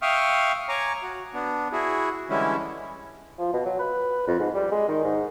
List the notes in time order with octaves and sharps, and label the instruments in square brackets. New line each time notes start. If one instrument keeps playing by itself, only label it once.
[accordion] E5 F5 G5 C#6 D#6 F6
C#5 G#5 A#5 C#6 D6
F#4
B3 D4
E4 F#4 G#4
D3 E3 G3 G#3 C#4 E4
[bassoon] F3
B2
F#3
B4
F2
G#2
G3
G#3
D#3
G#2